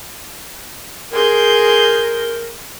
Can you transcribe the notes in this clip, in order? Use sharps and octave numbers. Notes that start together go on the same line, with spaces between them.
G#4 A#4 C6 G6